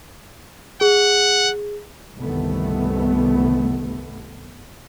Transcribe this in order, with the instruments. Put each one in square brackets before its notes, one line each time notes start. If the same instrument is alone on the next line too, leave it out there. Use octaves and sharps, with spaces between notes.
[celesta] G#4 [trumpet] F#5
[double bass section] G1 C2 C3 D#3 A3 B3